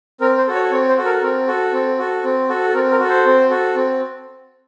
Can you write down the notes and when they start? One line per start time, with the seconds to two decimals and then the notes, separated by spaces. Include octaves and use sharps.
0.21 C4 A#4
0.38 C5
0.47 F#4 A4
0.55 C#5
0.71 C4 C#5
0.89 C5
0.97 F#4 A4
1.05 A#4
1.18 A4
1.22 C4 A#4
1.47 F#4 A4
1.73 C4
1.99 F#4 A4
2.24 C4
2.49 F#4 A4
2.70 A4
2.74 C4 A#4
2.91 A#4
2.99 F#4 A4
3.09 C5
3.26 C4
3.50 F#4 A4
3.75 C4